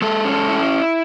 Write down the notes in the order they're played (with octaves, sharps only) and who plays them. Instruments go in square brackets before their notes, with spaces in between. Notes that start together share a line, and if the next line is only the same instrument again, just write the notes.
[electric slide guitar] G#3 A4
C#4
A4
E4